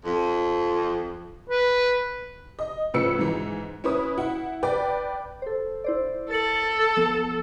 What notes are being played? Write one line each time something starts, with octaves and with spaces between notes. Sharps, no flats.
F2
B4
D#5
A2 C#3 F3 B4 E6 C#7
G#2 E3
C#4 E4 B4 D#6
E4 F#5
B4 D5 G5
A4 C5
E4 C5 D5
A4 A6 C#7 F#7
F3 B3